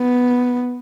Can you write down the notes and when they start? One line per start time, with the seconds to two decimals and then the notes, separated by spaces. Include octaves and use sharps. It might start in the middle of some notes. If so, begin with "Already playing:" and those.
Already playing: B3